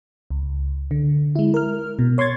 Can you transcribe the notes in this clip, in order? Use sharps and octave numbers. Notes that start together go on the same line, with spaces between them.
C#2
D3
G#3 E4
A#4 F6
B2
C#5 C6 C#6 G#6 A6